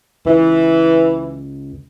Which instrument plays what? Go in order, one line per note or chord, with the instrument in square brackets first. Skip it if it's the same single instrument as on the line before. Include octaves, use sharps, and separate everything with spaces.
[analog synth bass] C#2 [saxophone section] E3